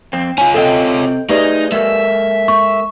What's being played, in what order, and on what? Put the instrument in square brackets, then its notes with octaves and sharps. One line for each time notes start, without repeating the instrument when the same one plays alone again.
[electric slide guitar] F2 C4
[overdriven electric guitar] C#4 F4 [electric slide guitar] G#5
[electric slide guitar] C3 C4 G5 [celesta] A4 D#5
[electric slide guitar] A3 G#4 D#5 [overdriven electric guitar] D#4 [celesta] G4 B4 D5
[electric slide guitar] G#3 A4 A#4 [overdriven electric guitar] E5
[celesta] C#6